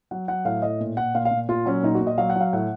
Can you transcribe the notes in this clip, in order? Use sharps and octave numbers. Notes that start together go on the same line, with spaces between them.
F#3 F#5
F#3 F#5
A2 F5
A2 D#5
A#2
A#2 F#5
A#2 F5
F5
A#2
A#2 F4
F#3 C#4
A#2 D#4
F#4
A#2
D#5
F#3 F5
F#5
F#3 F5
A2 F#5